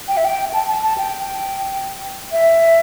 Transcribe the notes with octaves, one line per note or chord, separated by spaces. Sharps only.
G5
E5
G5
A5
A5
A5
G5
E5